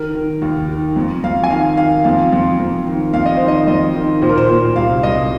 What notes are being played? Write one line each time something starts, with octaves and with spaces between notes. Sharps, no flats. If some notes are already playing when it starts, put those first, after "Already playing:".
Already playing: D#3 A#4
D#3
D#2
D#3
F2
F2 F5
G#5
D#3 F5
D#3 F5
F2 F5
F2
F2
D#3
F2 F5
D#5
D#3 C5
D#5
F2 D#5
D#3
A#2 C5
A#4
C5
A#2 C5
C2 F5
C2 D#5